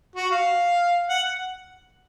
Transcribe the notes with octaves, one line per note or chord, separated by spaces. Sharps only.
F#4
F5
F#5